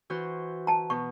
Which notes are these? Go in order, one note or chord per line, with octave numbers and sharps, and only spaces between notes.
E3 F#4 C5
A5 A#5
B2 C#6